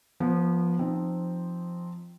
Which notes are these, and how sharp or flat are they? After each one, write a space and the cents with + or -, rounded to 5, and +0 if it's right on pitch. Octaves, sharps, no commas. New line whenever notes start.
F3 -5 B3 -30
F3 +0 C4 +0 D#4 -20